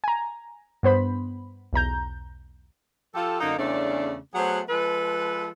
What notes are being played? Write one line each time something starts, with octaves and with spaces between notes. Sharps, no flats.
G#5 A#5
G2 B3 C5 B5
B1 E2 A#5 G6
F3 F4 G4 A4
F#2 D3 A#3 D#4
E2 C#3 A3 C#4 D4 D5
F#3 A3 B3 G#4 C5 F#5
F3 G#3 A4 B4